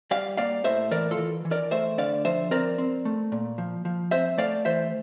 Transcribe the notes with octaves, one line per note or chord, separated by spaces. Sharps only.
G3 D5 F5
A#3 D5 F5
A2 C5 E5
E3 A#4 D5
F4 A4
E3
E3
A#4 D5
A3 C5 E5
D3 D5 F5
F3 C5 E5
C4 A#4 D5
C4
A3
A#2
F3
F3
C4 C5 E5
A3 D5 F5
E3 C5 E5